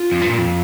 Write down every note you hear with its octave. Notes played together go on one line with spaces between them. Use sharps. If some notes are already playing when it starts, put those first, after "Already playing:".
Already playing: F4
F2
G2
A#2
F2